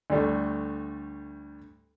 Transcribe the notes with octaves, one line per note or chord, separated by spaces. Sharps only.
D2 G3 A3